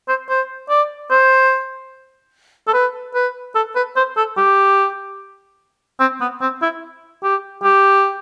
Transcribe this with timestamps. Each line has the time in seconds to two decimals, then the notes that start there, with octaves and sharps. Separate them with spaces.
0.08 C5
0.29 C5
0.70 D5
1.10 C5
2.67 A4
2.74 B4
3.15 B4
3.55 A4
3.76 B4
3.96 C5
4.17 A4
4.37 G4
6.00 C4
6.21 B3
6.41 C4
6.62 E4
7.23 G4
7.63 G4